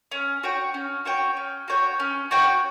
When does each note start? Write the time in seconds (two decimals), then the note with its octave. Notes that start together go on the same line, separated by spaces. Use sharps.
0.12 C#4
0.43 F#4 C#5 G5
0.74 C#4
1.05 F#4 C#5 G5
1.37 C#4
1.68 F#4 C#5 G5
2.00 C#4
2.31 F#4 C#5 G5